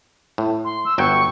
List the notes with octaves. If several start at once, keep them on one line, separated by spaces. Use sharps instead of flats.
A2
C6
E6
G1 F#3 G5 C#6